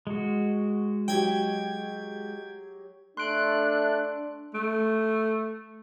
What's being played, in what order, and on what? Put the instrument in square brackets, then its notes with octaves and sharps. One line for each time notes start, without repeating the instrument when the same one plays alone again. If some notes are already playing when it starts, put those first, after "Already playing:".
[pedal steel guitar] G#3 F#4
[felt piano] F#3 G4 [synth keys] G5 G#6
[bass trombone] A3 [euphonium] D4 [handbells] C6 D7 [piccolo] F#6
[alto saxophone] A3